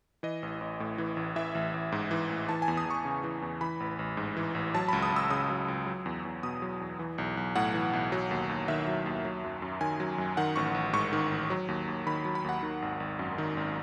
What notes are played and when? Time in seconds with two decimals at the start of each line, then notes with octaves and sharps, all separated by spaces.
0.23 E3 D#5
0.43 A1
0.61 A1
0.80 A2
0.98 E3
1.17 A1
1.36 E3 E5
1.55 A1
1.74 A1
1.92 G#2
2.11 E3
2.29 A1
2.49 E3 A5
2.62 G#5
2.68 E2
2.77 D#6
2.86 E2 C#6
3.05 C#3
3.24 E3
3.42 E2
3.61 E3 B5
3.80 A1
3.99 A1
4.17 G#2
4.37 E3
4.55 A1
4.75 F#3 A5
4.88 C#2 B5
5.02 D#6
5.12 C#2 E6
5.30 C#3 D#6
5.50 F#3
5.68 C#2
5.87 F#3
6.06 E2
6.25 E2
6.43 B2 D#6
6.62 F#3
6.81 E2
6.99 E3
7.18 B1
7.37 B1
7.56 A2 F#5
7.74 E3
7.93 B1
8.12 F#3
8.31 D#2
8.49 D#2
8.68 D#3 E5
8.87 F#3
9.06 D#2
9.25 F#3
9.44 F#2
9.62 F#2
9.81 D#3 G#5
10.00 F#3
10.18 F#2
10.37 D#3 F#5
10.56 A1 C#6
10.75 A1
10.93 G#2 C#6
11.13 D#3
11.32 A1
11.50 F#3
11.68 D#2
11.87 D#2
12.06 D#3 B5
12.25 F#3
12.35 B5
12.44 D#2 F#5
12.63 D#3
12.82 G#1
13.00 G#1
13.19 F#2
13.38 D#3
13.57 G#1